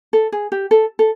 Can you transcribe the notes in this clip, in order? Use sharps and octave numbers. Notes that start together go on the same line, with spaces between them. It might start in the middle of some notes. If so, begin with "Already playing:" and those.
A4
G#4
G4
A4
A4